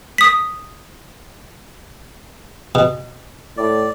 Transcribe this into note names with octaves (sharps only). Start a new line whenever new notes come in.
D#6 B6
B2
A2 D5